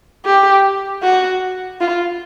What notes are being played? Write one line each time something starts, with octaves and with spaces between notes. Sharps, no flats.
G4
F#4
F4